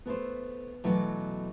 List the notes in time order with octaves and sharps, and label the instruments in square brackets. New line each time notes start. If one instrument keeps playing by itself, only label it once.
[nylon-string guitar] A3 E4 A4 C5 [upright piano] B3
[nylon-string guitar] B2 F#3 A3 [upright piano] E3